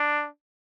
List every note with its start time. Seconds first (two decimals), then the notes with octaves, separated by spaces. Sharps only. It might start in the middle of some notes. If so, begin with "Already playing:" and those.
Already playing: D4